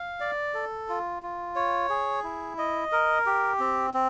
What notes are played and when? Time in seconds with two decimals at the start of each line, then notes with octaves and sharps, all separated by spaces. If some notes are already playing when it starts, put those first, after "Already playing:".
Already playing: F5
0.20 D5
0.54 A4
0.89 F4
1.23 F4
1.56 C#5
1.89 G#4
2.24 E4
2.58 D#5
2.92 A#4
3.26 G4
3.60 C4
3.94 C4